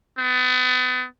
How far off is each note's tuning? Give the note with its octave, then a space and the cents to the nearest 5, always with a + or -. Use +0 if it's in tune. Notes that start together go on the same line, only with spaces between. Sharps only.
B3 +35